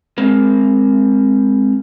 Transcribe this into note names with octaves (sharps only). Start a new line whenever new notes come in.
G#3 C4 A#4